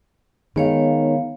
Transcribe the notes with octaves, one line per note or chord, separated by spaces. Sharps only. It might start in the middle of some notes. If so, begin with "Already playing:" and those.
D#3 G#3 B3 C#5 F5